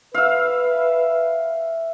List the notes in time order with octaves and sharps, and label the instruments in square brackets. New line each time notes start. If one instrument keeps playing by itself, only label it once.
[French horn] B4 [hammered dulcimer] E5 F5